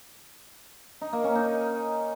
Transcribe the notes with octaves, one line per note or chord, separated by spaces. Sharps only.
D#4
A#3
C#4
D#4